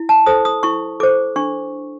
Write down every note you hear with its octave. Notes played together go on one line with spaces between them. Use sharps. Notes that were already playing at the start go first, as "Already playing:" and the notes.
Already playing: E4
A5
A4 C5 D#6
D#6
E4 C#6
A4 C5 D6
D4 C#6